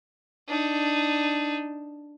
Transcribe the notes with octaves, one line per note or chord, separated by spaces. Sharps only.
D4 D#4